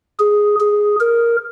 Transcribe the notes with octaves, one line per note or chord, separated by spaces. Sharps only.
G#4
G#4
A#4